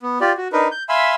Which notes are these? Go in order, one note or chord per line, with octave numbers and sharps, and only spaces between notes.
B3
F4 G4 D5
F#4
D4 D#4 A#4 B4
G6
E5 F5 G#5 B5 C6 E6